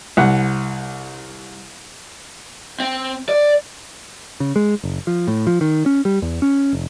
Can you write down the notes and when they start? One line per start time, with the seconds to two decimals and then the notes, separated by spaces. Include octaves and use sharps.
0.17 C2 F#5
2.80 C4
3.29 D5
4.40 C#3
4.56 G#3
4.84 F#1
5.07 F3
5.28 A2
5.47 F3
5.61 D#3
5.86 C#4
6.05 G3
6.22 E2
6.42 C#4
6.73 F1